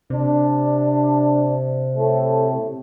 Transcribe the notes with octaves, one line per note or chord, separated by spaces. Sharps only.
C3 D4
A2 A3